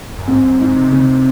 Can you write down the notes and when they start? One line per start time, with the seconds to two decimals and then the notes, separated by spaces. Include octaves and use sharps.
0.18 F#2
0.27 G#2 C4
0.44 F#2
0.60 G#2 D#4
0.76 C3
0.89 C#3 C4
1.00 C3